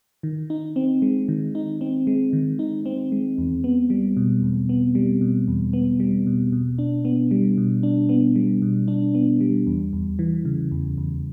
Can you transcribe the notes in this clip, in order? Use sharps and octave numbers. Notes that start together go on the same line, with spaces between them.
D#3
D#4
C4
G#3
D#3
D#4
C4
G#3
D#3
D#4
C4
G#3
E2
B3
G3
B2
E2
B3
G3
B2
E2
B3
G3
B2
B2
D4
B3
G3
B2
D4
B3
G3
B2
D4
B3
G3
E2
E2
E3
C#3
E2
E2